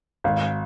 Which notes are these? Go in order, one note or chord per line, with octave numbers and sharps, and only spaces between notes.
G#1 F5